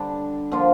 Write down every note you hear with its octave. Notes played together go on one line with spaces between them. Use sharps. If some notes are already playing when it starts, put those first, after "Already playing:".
Already playing: D3 G3 D4
D3 F3 A#3 F4